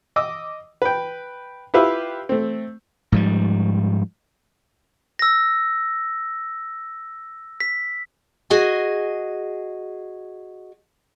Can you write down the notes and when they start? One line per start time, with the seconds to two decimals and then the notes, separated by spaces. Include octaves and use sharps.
0.16 D#5 D6 E6
0.82 B4 G5
1.74 E4 F4 G4 B4 E5 F5
2.29 A3 C4
3.12 G#2 F3 G3
5.19 E6 A#6
7.60 B6
8.50 F#4 G#4 D#5 G#5